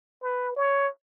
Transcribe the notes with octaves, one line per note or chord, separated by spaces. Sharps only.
B4
C#5